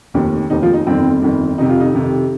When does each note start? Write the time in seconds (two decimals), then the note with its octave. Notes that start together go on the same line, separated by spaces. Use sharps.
0.14 F1 D#2 D#3
0.50 F1 D#2 D#3 D#4
0.62 F3 F4
0.74 D#4
0.87 G1 F2 D#3 C4
1.22 G1 F2 D#3
1.58 F2 C3 D#3 D#4
1.69 F4
1.80 D#4
1.93 F2 C3 D#3